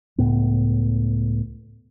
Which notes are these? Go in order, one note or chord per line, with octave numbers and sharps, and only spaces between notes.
C#2 A2 B3